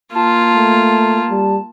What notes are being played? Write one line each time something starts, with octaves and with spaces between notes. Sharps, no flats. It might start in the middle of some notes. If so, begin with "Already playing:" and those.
A#3 F4 A5
A3
G3